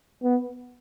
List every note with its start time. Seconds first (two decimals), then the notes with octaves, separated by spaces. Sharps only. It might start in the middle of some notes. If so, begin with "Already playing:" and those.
0.24 B3